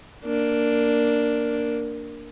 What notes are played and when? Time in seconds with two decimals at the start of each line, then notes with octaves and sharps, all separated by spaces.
0.24 A#3 D4